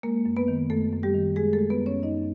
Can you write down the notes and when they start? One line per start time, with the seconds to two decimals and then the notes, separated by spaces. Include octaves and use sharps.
0.03 G#3 A#3 A#4
0.25 F#2
0.36 B3 B4
0.48 D#3
0.70 F#2 A3 A4
0.92 F#2
1.03 G3 G4
1.14 D#3
1.36 G#3 G#4
1.53 A3 A4
1.59 G#3
1.70 B3 B4
1.81 F#2
1.86 C#4 C#5
2.03 F#2 D#4 D#5